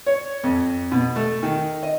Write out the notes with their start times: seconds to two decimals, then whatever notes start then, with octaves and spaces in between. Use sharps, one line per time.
0.06 C#5
0.44 F2
0.92 B2
1.16 A3
1.43 D#3
1.83 D#5